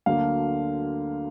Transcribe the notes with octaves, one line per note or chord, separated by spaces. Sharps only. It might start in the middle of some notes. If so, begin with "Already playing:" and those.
D2 D3 F#3 A#3 F5